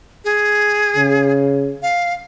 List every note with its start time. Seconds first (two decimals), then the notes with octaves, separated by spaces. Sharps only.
0.24 G#4
0.96 C#3
1.82 F5